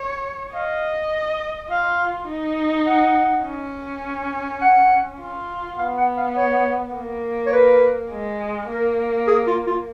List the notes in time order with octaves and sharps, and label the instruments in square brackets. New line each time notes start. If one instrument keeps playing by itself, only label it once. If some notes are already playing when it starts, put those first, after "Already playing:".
Already playing: [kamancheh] C#5
[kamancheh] D#5 [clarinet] F5
[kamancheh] F4 [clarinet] F5
[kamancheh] D#4
[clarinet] F#5
[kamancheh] C#4
[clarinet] F#5
[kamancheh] F4
[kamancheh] B3 [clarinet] F5
[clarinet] F#5
F5
C#5
[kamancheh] A#3
[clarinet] C#5
B4
[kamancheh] G#3
[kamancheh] A#3 [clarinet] A#4
[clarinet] G#4
F4
F4